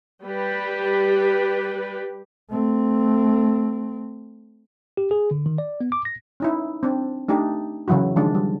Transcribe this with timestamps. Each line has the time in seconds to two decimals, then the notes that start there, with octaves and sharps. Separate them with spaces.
0.23 G3 G4 B4
2.50 A3 C4
4.97 G4
5.11 G#4
5.31 D3
5.46 D#3
5.58 D5
5.81 B3
5.92 D6
6.05 A#6
6.40 C#4 D#4 E4
6.83 C4 D4
7.28 A3 D4 D#4 G4
7.88 C#3 E3 F#3 E4 F#4
8.16 D#3 F3 G#3 C#4 D4 F4
8.35 G3